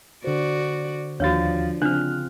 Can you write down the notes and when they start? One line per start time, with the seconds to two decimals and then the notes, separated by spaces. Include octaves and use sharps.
0.24 D3 F#4 C5 D5
1.20 D#2 F3 D4 F#4 C#5 F5 A6
1.82 C#3 C4 D4 F4 F6 F#6